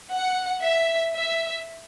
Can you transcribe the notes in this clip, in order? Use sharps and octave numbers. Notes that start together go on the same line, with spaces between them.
F#5
E5
E5